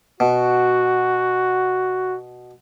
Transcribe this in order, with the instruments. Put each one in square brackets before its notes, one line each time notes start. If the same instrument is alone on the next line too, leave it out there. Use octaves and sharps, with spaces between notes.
[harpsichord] B2 [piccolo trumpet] F#4